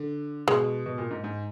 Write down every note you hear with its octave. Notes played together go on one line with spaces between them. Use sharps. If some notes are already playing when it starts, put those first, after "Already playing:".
Already playing: D3
B2 G#3
B2
A#2
G#2
G#2